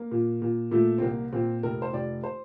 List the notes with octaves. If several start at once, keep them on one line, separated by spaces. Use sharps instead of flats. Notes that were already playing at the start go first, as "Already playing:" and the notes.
Already playing: A#3
A#2
A#2
A#2 A3
C4
C2 A#3
A#2 C4
F1 A#4
C5
F1 D5
C5